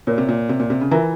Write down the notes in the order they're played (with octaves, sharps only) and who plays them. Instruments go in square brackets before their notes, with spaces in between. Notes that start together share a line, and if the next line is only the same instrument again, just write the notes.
[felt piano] A#2 [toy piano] F4 A#4 C#5
[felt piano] C3
A#2
C3
A#2
C3
C#3
[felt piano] E3 [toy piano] F4 A#4 E5 A#5